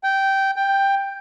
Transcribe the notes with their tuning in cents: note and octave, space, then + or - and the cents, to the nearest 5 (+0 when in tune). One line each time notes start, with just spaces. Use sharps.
G5 -10
G5 +10